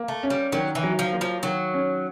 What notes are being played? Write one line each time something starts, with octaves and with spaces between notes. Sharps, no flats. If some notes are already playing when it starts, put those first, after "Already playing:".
Already playing: A#3
A3
C#4
G3
D#3 F#3
E3
F#3
F3
A#3
F3
D#3 F#3
C#4